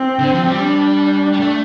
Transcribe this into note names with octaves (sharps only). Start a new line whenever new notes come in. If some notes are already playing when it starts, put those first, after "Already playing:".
Already playing: C4
D3
F3
G3
D4
G3
A3